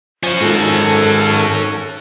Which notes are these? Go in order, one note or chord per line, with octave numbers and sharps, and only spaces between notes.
F3 C#4 F#4
G#2 D#3 A4